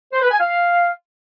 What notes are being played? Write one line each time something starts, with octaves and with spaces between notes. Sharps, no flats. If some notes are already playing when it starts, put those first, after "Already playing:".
C5
B4
G#5
F5